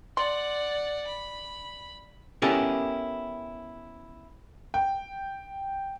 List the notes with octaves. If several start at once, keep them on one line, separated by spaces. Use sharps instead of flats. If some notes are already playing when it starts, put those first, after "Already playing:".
D5 F#5 C6
B5
B3 C#4 E4 G4 A4 A#4
G5